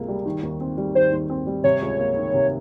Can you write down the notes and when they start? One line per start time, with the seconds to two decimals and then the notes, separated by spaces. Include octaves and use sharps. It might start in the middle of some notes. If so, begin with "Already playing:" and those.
Already playing: C#2 C3 A#3
0.08 G3
0.26 D#3
0.43 D#2
0.60 C4
0.78 G3
0.95 D#3 C5
1.12 D#2
1.30 C4
1.47 G3
1.64 C3 C#5
1.82 C#2
1.99 A#3
2.17 D#3
2.34 C3